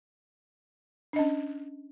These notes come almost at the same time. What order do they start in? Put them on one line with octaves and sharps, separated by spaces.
D4 D#5 C#4